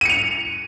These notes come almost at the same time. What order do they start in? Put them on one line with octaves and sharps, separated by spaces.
D#7 C#7 F7